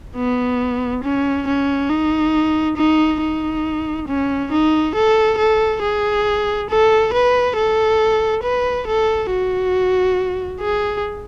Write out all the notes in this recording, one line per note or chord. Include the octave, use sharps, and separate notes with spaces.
B3
C#4
C#4
D#4
D#4
D#4
C#4
D#4
A4
A4
G#4
A4
B4
A4
B4
A4
F#4
G#4